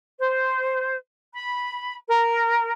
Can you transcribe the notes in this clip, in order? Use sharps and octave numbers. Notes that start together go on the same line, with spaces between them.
C5
B5
A#4